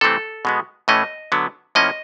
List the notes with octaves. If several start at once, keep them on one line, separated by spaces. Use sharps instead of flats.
C3 E3 A3 C4 A4
B2 G#3 B3
A2 E3 A3 C#4 D#5
D3 F#3 B3
A2 F3 A#3 C#4 D#5